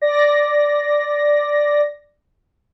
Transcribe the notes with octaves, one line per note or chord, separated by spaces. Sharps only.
D5 A#6